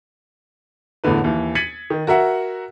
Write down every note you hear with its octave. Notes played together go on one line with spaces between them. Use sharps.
A1 E2 A2 D3 B4
D#2 E3
G#6 A6 B6 C#7 D#7 F#7
D#3
F#4 A#4 E5 F#5